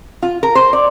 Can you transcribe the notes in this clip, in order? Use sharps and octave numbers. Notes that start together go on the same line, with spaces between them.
F4
A#4
C5
D5